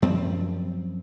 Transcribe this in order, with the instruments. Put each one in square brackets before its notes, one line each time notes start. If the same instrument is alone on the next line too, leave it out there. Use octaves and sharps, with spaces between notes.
[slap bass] F#2 F3 C4